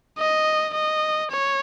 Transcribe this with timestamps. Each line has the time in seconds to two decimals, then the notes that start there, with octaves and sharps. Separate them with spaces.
0.19 D#5
0.74 D#5
1.31 C#5